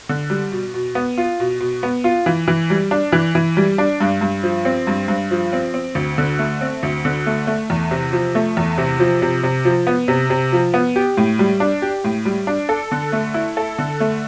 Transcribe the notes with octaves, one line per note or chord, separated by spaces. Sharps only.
D3
G3
B2
B2
B3
F4
B2
B2
B3
F4
E3
E3
G3
D4
E3
E3
G3
D4
G2
G2
F3
C4
G2
G2
F3
C4
C4
D2
D3
A3
C4
D2
D3
A3
A3
E2
C3
F3
A3
E2
C3
F3
C3
C3
F3
B3
C3
C3
F3
B3
G4
A2
G3
D4
G4
A2
G3
D4
A4
D3
A3
E4
A4
D3
A3